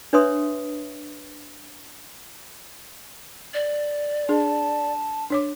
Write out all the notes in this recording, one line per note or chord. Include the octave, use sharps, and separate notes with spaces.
D4 B4 C#5 E5 C6 D#6
D5
D4 G#4 A5
D4 C#5 D6